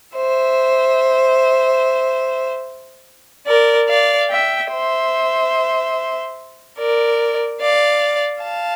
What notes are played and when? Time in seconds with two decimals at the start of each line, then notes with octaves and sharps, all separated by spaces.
0.16 C5 E5
3.47 A#4 D5
3.88 D5 F5
4.30 E5 G5
4.71 C5 E5
6.79 A#4 D5
7.61 D5 F5
8.44 F5 A5